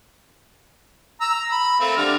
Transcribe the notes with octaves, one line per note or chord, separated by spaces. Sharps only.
A#5 E6
B5
A3 A#3 C4
D3 G3 F6